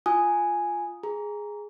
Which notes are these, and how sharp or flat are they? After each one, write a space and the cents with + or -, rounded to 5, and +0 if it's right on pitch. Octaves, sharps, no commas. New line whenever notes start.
F4 +0 G#5 +0 D#6 +0
G#4 +0 A#5 +0